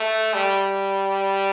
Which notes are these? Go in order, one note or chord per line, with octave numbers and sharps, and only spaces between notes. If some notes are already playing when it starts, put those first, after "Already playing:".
Already playing: A3
G3